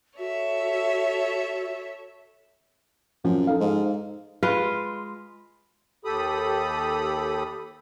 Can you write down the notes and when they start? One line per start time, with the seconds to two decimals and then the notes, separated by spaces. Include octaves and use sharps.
0.18 F#4 A4 C#5 E5
3.25 F#2 F3
3.47 D#4 A4 F5
3.60 G#2
4.43 G#3 F4 B4
6.05 D#2 G4 A4 B5 D#6